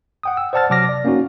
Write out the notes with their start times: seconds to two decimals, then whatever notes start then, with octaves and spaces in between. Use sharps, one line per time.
0.23 F#5 G5 D#6
0.37 E6
0.53 C5 D5 F#5 A5 F6 A6
0.70 C3 F#3 A5 D6 F6 A#6
0.89 D5
1.05 A#3 C#4 D#4 F#4